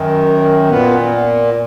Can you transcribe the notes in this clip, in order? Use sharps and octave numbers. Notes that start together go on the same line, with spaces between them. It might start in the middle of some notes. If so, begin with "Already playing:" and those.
Already playing: F#2 D#3
A#2 B3